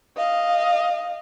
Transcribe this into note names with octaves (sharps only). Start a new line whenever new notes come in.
D#5 F5